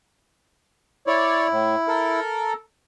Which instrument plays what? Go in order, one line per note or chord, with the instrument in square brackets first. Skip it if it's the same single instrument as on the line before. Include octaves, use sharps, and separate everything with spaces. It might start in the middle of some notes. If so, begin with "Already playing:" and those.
[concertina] E4 [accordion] C#5 D5
[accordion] A2
A4 A#4